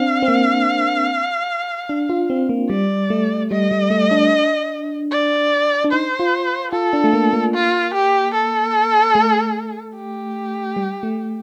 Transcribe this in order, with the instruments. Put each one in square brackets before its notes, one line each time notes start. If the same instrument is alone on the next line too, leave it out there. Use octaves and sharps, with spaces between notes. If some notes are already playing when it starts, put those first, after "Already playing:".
Already playing: [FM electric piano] C4 D4 [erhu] F5
[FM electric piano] C4
A#3
D4
F4
C4
A#3
[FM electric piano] G3 [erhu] D5
[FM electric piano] A3
[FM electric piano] G3 [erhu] D#5
[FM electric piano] G3
A3
D4
[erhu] D5
[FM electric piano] D4
[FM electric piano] D#4 [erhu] C5
[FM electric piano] F4
[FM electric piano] F4 [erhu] A4
[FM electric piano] D4
A3
A#3
A#3
[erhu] F4
G4
A4
[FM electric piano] A3
[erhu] G4
[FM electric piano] G3
A3